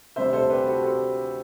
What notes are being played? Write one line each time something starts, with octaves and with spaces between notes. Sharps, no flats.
D2 C3 G3 C5 E5
A4 C5
G4 B4
F#4 A4
A4 C5